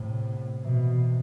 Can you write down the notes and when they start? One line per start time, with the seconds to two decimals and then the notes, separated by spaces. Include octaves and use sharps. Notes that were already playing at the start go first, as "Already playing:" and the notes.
Already playing: A2 C3
0.24 B3
0.64 B2 E3
1.03 C3